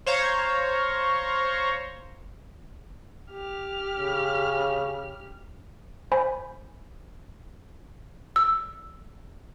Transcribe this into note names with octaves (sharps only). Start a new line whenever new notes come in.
C5 C#5 F5 A#5
G4 F6
C#3
C5 G#5 B5
E6